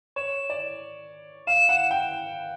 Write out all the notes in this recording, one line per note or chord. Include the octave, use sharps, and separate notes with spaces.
C#5 E7
D5
F5 E7
F#5
G5